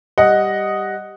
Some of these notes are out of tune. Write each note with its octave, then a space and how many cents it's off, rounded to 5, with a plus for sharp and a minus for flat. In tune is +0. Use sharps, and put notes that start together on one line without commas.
G3 +0 D#5 +0 F#5 +0